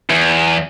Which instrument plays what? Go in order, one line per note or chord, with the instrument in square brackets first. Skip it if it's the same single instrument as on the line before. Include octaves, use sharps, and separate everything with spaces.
[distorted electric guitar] E2